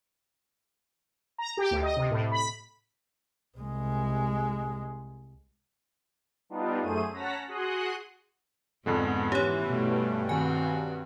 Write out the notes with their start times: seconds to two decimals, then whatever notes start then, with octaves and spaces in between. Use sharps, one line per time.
1.38 A#5
1.57 G4
1.71 D2
1.83 D#5
1.97 C3
2.10 A2
2.32 B5
3.58 C2 G#3
6.50 G3 B3 D4 D#4 F4
6.82 F#2 A3 G#4 C5 D#7
7.13 C#4 F#5 A5 A#5 A#6 B6
7.48 F#4 G#4 C6 D#6 F#6
8.86 F2 G#2 D3 F3 G#3 B3
9.32 E3 C#4 G4 C#5
9.66 G2 B2 G3 A3
10.29 D#3 C4 F#4 G#5